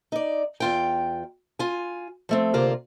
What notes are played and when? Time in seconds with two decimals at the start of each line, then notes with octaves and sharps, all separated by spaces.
0.12 D#4 D5
0.60 E2 F4 G5
1.59 F4 G#5
2.29 F3 A3 C4
2.54 D2 C3 A#3 F4 C5 D5